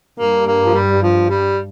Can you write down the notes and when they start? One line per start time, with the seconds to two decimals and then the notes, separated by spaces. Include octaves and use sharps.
0.18 G2 A#3
0.47 A#3
0.65 F3
0.74 G3
1.02 F3
1.30 G3